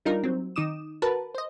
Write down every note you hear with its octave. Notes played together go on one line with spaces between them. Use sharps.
G3 D4 D#4 F4 A#4
F#3 C4
D#3 D#4 D6 D#6 E7
F#4 A#4 B4 A5
C5 D#5